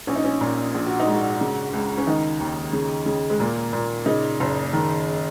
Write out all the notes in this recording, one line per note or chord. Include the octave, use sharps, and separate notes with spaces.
A#1 C#4
D#4
C#4
A#2
A#1
F#4
D#4
G#2
F#4
C#3
C#2
C#4
D#3 D#4
D#2
C#3
C#3
G#3
A#2 A#3
A#2
C#3 D#4
F#1
D#3